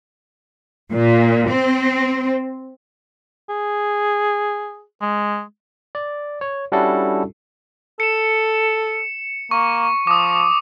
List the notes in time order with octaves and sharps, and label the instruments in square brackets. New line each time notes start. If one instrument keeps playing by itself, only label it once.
[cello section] A#2
C4
[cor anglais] G#4
G#3
[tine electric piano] D5
C#5
G3 C#4 D4 E4 F#4 A4
[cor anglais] A4 [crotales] C#7 E7
[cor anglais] A#3 [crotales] C#6
[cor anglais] F3 [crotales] D6 D#6